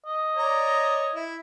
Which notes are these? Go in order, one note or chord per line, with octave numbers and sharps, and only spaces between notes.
D#5
C#5 D5 A#5
E4